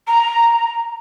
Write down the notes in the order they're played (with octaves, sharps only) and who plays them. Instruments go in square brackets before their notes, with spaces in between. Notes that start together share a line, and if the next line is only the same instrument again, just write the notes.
[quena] A#5